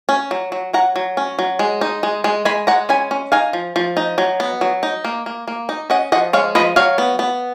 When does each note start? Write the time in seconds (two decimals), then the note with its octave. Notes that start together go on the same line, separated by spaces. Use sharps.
0.09 C#4
0.31 F#3
0.52 F#3
0.73 F#3 F#5 A#5
0.96 F#3
1.17 C#4
1.39 F#3
1.59 G#3
1.81 D#4
2.03 G#3
2.24 G#3
2.45 G#3 G#5 B5
2.67 G#3 F#5 A#5
2.89 C#4 G#5 B5
3.11 C#4
3.32 D#4 F5 G#5
3.53 F3
3.76 F3
3.97 D#4
4.18 F#3
4.40 B3
4.61 F#3
4.83 D#4
5.04 A#3
5.26 A#3
5.48 A#3
5.69 D#4
5.90 C#4 D#5 F#5
6.12 F3 D#5 F#5
6.33 G#3 C#5 F5
6.55 F3 B4 D#5
6.76 F#3 C#5 F5
6.98 B3
7.19 B3